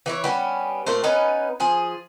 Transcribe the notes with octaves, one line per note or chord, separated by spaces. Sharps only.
E3 E4 C#5
G3 B3 C#4
A#2 A3 C5
B3 C#4 D#4 B4
F3 G#4